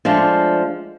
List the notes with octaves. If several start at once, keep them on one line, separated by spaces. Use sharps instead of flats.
F3 G#3 A3 D4